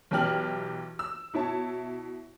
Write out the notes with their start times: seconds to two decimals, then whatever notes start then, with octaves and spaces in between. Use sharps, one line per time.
0.11 B1 E3 G4 F6 F#7
0.99 E6
1.34 B2 E4 C#5 A5